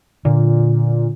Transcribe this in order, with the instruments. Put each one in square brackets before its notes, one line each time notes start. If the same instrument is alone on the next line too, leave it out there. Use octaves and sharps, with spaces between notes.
[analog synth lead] A#2 [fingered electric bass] D3